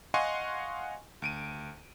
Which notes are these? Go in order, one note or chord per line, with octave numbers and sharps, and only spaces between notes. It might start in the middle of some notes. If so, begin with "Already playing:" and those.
D#5 F5 F#5 G#5 C6 C#6
D2 D7 D#7